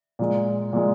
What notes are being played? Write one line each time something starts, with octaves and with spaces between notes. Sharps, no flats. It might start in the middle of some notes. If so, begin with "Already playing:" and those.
A#2 G#3
A#2 G#3